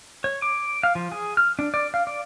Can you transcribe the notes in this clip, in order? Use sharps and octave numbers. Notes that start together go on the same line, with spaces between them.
C#5
D6
F5
F3
G#4
F6
D4
D5
F5
D5